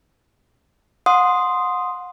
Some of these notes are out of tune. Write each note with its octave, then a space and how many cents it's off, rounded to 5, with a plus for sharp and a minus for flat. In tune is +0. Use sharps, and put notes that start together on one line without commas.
F#5 -35 C6 +0 D#6 +0